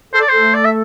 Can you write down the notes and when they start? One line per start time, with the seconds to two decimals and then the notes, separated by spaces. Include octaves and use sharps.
0.13 A4 C5
0.21 D5
0.29 A3 A4 C5
0.54 D5
0.64 E5